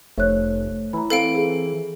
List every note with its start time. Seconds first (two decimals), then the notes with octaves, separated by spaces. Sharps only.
0.18 F1 A3 C5 C#5 F#6
0.93 E3 A#5 B5
1.10 C4 A4 B4 F5 D7
1.35 G#4